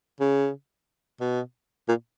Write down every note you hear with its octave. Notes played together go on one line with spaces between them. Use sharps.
C#3
B2
A#2